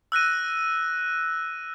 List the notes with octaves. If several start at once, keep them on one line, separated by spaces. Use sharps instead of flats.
E6 F#6 A#6 D#7